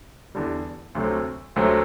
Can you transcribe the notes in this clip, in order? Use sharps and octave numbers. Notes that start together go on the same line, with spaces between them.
E2 D3 G3
D2 C3 F#3 A3 C4
D2 C3 F#3 A3 C4